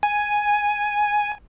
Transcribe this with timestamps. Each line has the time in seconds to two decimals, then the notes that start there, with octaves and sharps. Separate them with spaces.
0.03 G#5